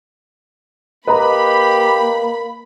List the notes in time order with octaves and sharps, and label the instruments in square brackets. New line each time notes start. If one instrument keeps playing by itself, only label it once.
[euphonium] A#3 [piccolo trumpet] G4 [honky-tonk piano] B4 D#5 A#5 [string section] B5